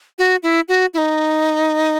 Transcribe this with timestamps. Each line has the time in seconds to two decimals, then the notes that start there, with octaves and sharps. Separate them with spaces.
0.19 F#4
0.43 E4
0.68 F#4
0.94 E4
0.98 D#4